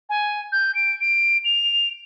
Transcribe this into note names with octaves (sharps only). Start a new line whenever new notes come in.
G#5
G6
D7
D7
F7